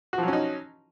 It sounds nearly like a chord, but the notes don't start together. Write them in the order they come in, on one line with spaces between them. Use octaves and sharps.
F#4 F3 F#3 C#4 D#4